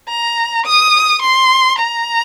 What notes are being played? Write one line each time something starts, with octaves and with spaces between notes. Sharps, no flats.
A#5
D#6
C6
A#5